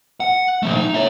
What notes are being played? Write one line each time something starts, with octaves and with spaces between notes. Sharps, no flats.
F#5
F3 A3
D#4
C#5 E5